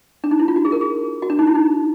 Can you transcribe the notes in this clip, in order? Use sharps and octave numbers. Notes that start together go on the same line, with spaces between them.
D4
D#4
E4
F4
F#4
G#4
A#4
G#4
F#4
D4
D#4
E4
D#4